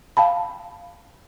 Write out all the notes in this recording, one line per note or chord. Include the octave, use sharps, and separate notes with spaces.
F5 G5 A5 B5